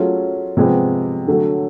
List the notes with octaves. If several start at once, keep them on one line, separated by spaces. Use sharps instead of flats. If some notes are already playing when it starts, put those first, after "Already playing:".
Already playing: F#3 A3 C#4 F4 G#4
C3 F3 G#3 B3
D3 F#3 A3